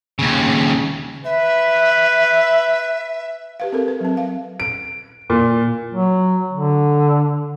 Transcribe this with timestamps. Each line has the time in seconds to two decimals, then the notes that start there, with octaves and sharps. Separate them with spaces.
0.19 D#2 C#3
1.25 B4 E5
3.60 G4 B4 F5
3.72 C4 A4 A#4
3.88 B4
4.00 F#3 C4
4.17 F5
4.60 D7
5.30 A#2
5.94 F#3
6.53 D3